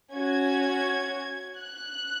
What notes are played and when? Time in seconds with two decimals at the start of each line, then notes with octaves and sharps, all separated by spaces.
0.14 C#4 F#4 G#6
1.59 F#6